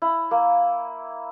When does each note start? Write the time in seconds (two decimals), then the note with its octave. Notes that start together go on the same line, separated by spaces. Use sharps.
0.02 E4
0.31 A#3